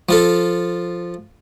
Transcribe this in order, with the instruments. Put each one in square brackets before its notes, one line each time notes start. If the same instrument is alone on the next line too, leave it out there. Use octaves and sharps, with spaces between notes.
[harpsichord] F3 F4 A4